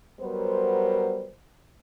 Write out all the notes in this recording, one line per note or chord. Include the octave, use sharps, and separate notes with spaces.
F#3 G3 B3 A#4 C5